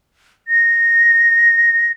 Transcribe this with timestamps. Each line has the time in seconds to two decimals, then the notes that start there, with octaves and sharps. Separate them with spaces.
0.48 A#6